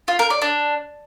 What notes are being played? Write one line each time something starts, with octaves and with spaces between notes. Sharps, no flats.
F4
A#4
D5
D4